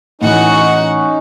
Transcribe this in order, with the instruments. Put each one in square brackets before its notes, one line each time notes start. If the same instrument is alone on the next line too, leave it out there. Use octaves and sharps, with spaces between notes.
[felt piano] A2 E3 [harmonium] C#4 D#4 [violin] F#4 F#5